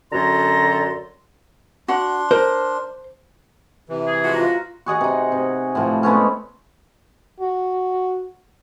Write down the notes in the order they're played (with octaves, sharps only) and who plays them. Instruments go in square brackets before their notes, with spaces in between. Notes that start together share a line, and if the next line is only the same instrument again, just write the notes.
[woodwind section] F#2 D3 F#4 A4 A#5 C6
[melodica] D4 C6 [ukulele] F#4 F#5
[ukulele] A#4 [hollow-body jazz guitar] C5
[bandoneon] C3 E3
[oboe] G#4
[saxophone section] F3 G#3 F#4
[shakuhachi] F4 [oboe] A#5
[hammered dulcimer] F#4 G#4 D#5 F#5
C3 D#4
C3
A2 F3
G#3 A3 B3 C#4
[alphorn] F#4